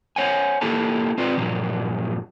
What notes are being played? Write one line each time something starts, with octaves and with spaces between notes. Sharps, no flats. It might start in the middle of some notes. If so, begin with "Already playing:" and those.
C5 C#5 F#5 G#5
A#3 E4 G4 A4 A5
C4 F4 B4 D5
G2 A#2 F3 F#3